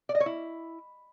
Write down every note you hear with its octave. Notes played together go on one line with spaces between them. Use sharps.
D5
D#5
C#5
E4